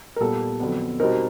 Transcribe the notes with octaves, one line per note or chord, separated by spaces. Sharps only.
A#4
A#2 G3 B3 A4
F2 D3 F#3 B3
B2 G3 C4 D#4 A#4